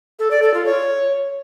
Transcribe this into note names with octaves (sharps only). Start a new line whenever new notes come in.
A4
D5
A4
F4
C#5